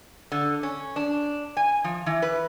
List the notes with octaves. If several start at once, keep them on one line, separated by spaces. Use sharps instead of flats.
D3
C#4
D4
G#5
F3
E3
B4